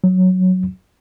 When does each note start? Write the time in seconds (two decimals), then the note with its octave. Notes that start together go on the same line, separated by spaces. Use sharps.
0.04 F#3